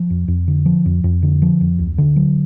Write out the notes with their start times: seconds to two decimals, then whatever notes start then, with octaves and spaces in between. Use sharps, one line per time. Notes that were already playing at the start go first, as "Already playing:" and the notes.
Already playing: F3
0.10 F2
0.28 F2
0.48 D3
0.66 F3
0.86 F2
1.04 F2
1.23 D3
1.42 F3
1.61 F2
1.79 D2
1.98 D3
2.16 F#3